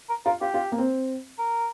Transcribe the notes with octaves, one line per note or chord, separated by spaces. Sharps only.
A#4
F4 A#4
F4 G4
F4
A#3
C4
A#4